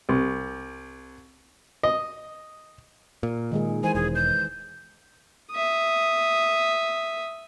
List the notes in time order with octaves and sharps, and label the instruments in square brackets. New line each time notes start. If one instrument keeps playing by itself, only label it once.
[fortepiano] C2
D#5
[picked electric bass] A#2 [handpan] A#4
[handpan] D#3 G#3 G#4
[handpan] E3 G#3 C5 [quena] G#5
[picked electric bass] E1 [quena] G#4
[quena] G6
[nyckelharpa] E5 D#6